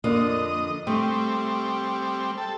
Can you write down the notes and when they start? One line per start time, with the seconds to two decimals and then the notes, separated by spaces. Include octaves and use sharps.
0.04 F2 D3 A#3 D#5
0.87 G3 A3 C4
2.38 A4